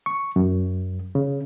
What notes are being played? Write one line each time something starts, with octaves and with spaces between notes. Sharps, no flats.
C#6
F#2
C#3